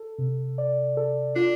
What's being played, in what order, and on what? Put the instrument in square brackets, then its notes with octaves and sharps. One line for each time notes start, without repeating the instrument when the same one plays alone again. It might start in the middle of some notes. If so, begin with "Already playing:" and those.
Already playing: [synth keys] A4
C3
D5
A4
[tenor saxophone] D4 [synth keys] F4